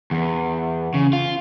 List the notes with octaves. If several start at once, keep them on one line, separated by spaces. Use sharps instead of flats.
E2
C#3
F4